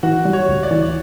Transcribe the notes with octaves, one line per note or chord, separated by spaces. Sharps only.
E3 F#4
G3
C#5
D2
D5
E3